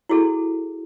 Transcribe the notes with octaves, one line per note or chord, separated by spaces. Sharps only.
E4 F#4 G#4 A4